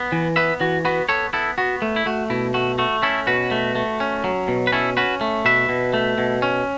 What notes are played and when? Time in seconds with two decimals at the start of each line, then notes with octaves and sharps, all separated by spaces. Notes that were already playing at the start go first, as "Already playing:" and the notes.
Already playing: B3
0.12 E3
0.36 B3 B4 E5
0.60 E3 F#4
0.85 B3 F#4 B4
1.09 B3 A4 C#5
1.33 B3 E4 A4
1.58 B3 F#4
1.82 A3
1.96 E4
2.06 A3 F#4
2.30 B2 E4
2.54 A3 F#4
2.78 A3 F#4
3.02 C#4 E4 A4
3.27 B2 F#4 B4
3.51 A3
3.75 A3
4.00 C#4
4.24 F#3
4.48 B2
4.67 B4
4.72 C#4 E4 A4
4.97 C#4 F#4 B4
5.21 A3
5.45 B2 B4 E5
5.69 B2
5.94 A3
6.18 B2
6.42 C#4